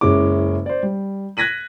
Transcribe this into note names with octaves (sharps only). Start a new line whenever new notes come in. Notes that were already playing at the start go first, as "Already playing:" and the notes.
F#1 G#3 C#4 E4 D6
C5 D5
G3
F#6 G#6 A#6 B6 D#7 F#7